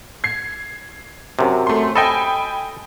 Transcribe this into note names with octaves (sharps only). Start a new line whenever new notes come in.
G#6 C7
F#2 C3
A3 C6
A4 D#5 G5 G#5 B5